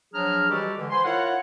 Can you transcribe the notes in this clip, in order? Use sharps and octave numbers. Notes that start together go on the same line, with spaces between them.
F3 F#3 D4 G#4 A#5 F6
E3 G3 G#3 F#4 G4 A4
D3 E3
B4 C5 G#5 C6
E4 F4 A#4 C#5 F#5